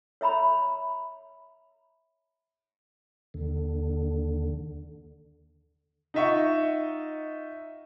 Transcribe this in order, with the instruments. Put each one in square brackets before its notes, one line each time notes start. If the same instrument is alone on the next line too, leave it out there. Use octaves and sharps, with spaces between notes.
[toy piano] C#5 E5 A#5 B5
[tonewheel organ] D#2 D3
[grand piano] D#4 F4 D#5 E5 F#5 C#6